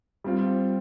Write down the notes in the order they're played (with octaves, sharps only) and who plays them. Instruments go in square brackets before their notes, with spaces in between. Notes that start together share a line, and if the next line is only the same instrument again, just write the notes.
[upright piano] G3 C4 F4